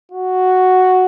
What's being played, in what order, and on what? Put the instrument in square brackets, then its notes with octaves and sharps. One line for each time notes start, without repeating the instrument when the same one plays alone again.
[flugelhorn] F#4